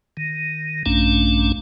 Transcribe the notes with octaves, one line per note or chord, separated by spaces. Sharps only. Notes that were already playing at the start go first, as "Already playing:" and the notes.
D#3
A#1 G2 A3 C#4 D4